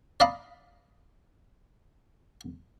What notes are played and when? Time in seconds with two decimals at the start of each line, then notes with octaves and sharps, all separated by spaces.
0.20 D5 D#5 F5 A#5 B5